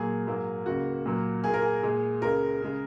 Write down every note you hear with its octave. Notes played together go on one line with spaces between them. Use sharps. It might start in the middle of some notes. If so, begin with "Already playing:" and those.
Already playing: A#2 F#3 A#3 G#4
G#2 F#3 A#3
C#2 C#3 A#3 F#4
A#2 F#3 A#3
A#2 A#3 G#4
A#4
G#4
A#2 G#3
C#2 C#3 G#3 A#4
C#3 G#3